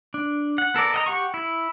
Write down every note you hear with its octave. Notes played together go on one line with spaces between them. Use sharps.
D4
F#5
B3 A4 A#4 D5
D#5 F#5 A#5
G4 F#5 C#6
E4